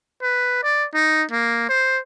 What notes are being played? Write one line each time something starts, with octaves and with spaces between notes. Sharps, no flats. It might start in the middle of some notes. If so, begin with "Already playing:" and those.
B4
D5
D#4
A#3
C5